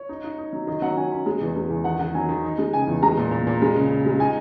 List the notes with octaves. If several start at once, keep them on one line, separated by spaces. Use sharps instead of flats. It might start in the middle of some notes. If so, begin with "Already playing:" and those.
Already playing: C#5
D#4
D#4
D#4
F#3
D#3 D#5
F#3 F#5
F#3 G#5
C#4
G#3
E2
G#3
E2
D#3 F#5
D#3 F#5
F#3 G#5
D#3
D#4
G#3
C#3 G#5
E2
G#3 A#5
A#2
A#2
A#2
G#3
C#3
C#3
G#3
D#4 G#5